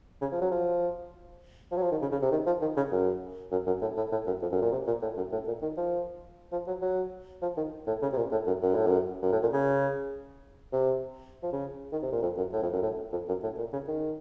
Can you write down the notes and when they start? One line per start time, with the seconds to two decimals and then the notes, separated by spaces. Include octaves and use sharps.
0.22 C#3
0.32 F3
0.42 F#3
0.51 F3
1.72 F3
1.77 F#3
1.82 F3
1.92 D#3
2.02 C#3
2.12 C#3
2.22 C3
2.32 D#3
2.47 F3
2.62 D#3
2.77 C#3
2.92 F#2
3.52 F#2
3.67 F#2
3.82 A2
3.97 A2
4.12 A2
4.27 F#2
4.42 F2
4.52 F#2
4.62 A#2
4.72 C3
4.87 A#2
5.02 A2
5.17 F#2
5.32 A2
5.47 A#2
5.62 D#3
5.77 F3
6.52 F3
6.67 F#3
6.82 F#3
7.42 F3
7.57 D#3
7.87 A2
8.02 C#3
8.13 C3
8.17 A#2
8.32 A2
8.47 F#2
8.62 F#2
8.75 A2
8.87 F#2
9.23 F#2
9.32 A2
9.43 A#2
9.53 C#3
10.73 C3
11.43 F3
11.53 C#3
11.93 D#3
12.03 C3
12.13 A#2
12.23 F2
12.38 F#2
12.53 A2
12.63 F2
12.73 F#2
12.83 A2
13.12 F2
13.28 F#2
13.43 A2
13.58 A#2
13.73 C#3
13.88 D#3